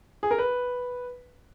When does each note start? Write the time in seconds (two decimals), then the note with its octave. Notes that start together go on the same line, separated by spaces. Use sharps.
0.23 G#4
0.31 A#4
0.38 B4